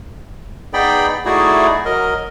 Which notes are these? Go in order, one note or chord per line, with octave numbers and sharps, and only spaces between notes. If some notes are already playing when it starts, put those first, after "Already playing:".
B3 D#4 G#4 D5 G5 B5
A3 D#4 E4 F#4 G#4 D5
F#3 A#4 D#5